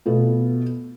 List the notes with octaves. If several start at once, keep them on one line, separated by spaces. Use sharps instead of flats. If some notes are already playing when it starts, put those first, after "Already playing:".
B2 A3 B3 F4